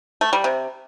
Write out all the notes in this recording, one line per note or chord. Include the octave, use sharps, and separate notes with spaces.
A3
G3
C3